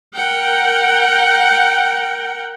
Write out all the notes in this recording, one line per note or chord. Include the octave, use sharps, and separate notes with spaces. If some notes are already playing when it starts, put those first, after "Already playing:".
A#4 F#5 G5